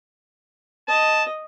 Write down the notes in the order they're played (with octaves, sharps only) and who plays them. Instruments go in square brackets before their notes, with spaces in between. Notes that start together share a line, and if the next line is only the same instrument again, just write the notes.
[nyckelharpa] D#5 [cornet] A5